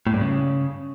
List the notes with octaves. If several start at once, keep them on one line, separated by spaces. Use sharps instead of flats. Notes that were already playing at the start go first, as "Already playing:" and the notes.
A2
G2
C#3